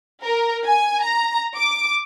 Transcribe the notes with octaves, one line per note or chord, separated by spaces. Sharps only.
A#4
G#5
A#5
D6